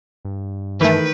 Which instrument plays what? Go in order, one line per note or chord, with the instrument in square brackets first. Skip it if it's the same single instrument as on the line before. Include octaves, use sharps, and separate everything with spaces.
[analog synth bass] G2
[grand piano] D#3 [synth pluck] E3 A3 [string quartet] B4